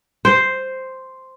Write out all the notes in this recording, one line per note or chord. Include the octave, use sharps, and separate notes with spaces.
C5